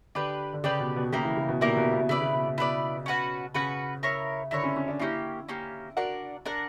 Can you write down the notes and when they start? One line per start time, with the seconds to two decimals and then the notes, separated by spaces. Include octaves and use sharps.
0.15 D3 D4 G4 B4 D5
0.53 D3
0.64 C#3 D4 G4 B4 D5
0.80 B2
0.96 B2
1.12 C#3 A#3 E4 G4 A#4
1.24 E3
1.37 C#3
1.49 B2
1.61 A#2 A#3 E4 G4 A#4
1.77 B2
1.93 B2
2.09 C#3 E4 B4 D5
2.21 C#3
2.33 B2
2.46 B2
2.58 B2 E4 B4 D5
3.06 C#4 F#4 B4 F#5
3.54 C#3 C#4 F#4 B4 F#5
4.03 E4 A#4 C#5
4.51 D3 E4 A#4 C#5
4.64 C#4
4.76 C#4
4.88 D4
5.00 A#3 C#4 E4 G4
5.48 A#3 C#4 G4
5.97 D4 F#4 A#4 D5 F#5
6.46 D4 A#4 D5 F#5